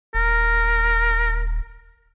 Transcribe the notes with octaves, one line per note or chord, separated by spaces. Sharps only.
D#1 A#4